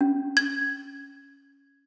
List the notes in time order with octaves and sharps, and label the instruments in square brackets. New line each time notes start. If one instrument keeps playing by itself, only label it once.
[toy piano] C#4
[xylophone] G#6